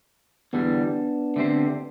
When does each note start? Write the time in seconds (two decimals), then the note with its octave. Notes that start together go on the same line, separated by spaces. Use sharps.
0.53 E2 D3 G3 B3 D4
1.36 D3 A3 C4 G4 C5